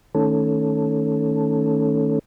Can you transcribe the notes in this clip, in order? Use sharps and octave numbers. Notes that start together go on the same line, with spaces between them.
D#3 A3 C#4 A4